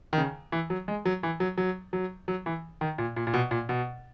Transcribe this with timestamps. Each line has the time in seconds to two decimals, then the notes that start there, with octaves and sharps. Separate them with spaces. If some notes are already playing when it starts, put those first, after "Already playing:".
0.13 D#3
0.18 C#3
0.52 E3
0.70 F#3
0.88 G#3
1.05 F#3
1.23 E3
1.40 F#3
1.58 F#3
1.93 F#3
2.28 F#3
2.46 E3
2.81 D#3
2.98 A#2
3.16 A#2
3.27 A#2
3.34 B2
3.51 A#2
3.69 B2